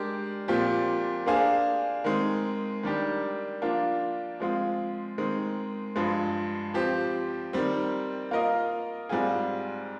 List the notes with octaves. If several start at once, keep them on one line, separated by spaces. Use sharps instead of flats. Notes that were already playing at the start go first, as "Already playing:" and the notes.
Already playing: G#3 D4 G4 A#4 D5
A#2 F3 C4 G4
A#3 D4 G#4 C5 F5
D#3 G#3 C4
D#3 G3 D4 G4
F3 A#3 D4 F4
F3 G#3 C4 F4
D#3 G#3 C4
G2 F3 G#3
F3 C4 G4 C5
D#3 G3 C4
A#3 F4 A#4 D#5
G#2 G3 C4 F4 G#4